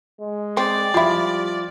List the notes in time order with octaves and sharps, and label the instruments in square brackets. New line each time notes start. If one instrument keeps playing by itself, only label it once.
[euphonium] G#3
[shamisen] C4 [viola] D5
[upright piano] F3 [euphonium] G3 [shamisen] G#3 E4